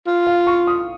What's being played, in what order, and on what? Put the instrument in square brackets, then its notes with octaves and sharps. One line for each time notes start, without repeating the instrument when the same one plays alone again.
[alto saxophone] F4
[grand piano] F5
C#6
D#6